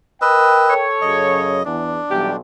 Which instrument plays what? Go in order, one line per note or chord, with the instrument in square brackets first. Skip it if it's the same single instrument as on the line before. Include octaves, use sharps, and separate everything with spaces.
[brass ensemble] A#4 G5 [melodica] B4 D#5 E6
[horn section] A4 C#5
[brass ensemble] F#2 C#3 [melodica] D#5
[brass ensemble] E2 [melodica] D4
[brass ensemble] B1 [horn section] E3 G3 G4